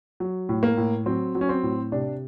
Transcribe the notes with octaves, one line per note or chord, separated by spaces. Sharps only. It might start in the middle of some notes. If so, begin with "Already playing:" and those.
F#3
A2
A#3
A2
F#3 C4
F#3
C#4
C4
A2
C3 D4